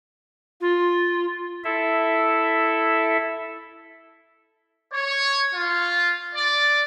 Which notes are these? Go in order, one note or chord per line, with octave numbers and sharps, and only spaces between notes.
F4
E4 A4 E5
C#5
F4
D5